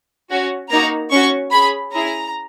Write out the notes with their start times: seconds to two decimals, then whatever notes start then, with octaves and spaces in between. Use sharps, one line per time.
0.30 C#4 F#4
0.70 A#3 D#4 F#4 A#5
1.11 C#4 F#4 C#6
1.51 C#4 G#4 B5
1.92 C#4 E4 G#4 A#5